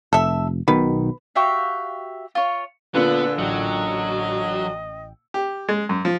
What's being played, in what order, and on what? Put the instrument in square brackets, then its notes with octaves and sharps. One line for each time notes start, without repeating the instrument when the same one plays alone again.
[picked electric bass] F1 [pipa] A4 E5
[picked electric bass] B1 B2 D#3 [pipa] B4
[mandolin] F#4 G4 E5 F5
F4 C#5
[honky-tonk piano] A#2 D3 [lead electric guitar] B3 [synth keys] F4 [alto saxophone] B4
[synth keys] A1 G5 [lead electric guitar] F#3 [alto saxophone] D#5
[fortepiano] G4
G#3
F#2
F3